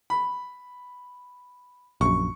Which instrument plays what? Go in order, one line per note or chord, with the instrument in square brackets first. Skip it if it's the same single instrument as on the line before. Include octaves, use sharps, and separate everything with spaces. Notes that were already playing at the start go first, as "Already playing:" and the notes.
[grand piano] B5
[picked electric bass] A#1 F#2 [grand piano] C#6